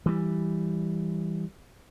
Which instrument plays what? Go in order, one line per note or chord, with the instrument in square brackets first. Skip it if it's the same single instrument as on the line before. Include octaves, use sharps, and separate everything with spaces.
[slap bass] E3 G3